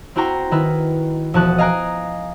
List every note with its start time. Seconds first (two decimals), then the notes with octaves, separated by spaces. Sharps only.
0.16 C4 E4 F#4 G5 A#5 C6
0.51 D#3 E4 A#4 B4
1.34 E1 F3 F#4 A5 D#6 F#6
1.58 D#5 F5 G#5 A#5 F#6 D7